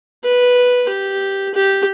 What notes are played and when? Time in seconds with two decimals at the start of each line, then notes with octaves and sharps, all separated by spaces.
0.24 B4
0.89 G4
1.54 G4